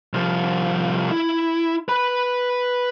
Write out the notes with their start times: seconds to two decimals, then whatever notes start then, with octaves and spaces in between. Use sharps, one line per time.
0.14 C2 F3
1.12 E4
1.89 B4 B5